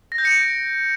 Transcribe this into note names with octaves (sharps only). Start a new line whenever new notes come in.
A#6
G6
C#7
D7